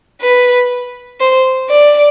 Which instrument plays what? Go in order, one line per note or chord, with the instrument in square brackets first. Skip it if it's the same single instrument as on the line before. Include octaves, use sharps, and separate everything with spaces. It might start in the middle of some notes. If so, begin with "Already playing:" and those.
[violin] B4
C5
D5